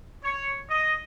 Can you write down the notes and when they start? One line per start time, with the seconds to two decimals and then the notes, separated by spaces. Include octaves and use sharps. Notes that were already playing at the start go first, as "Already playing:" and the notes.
0.23 C#5
0.70 D#5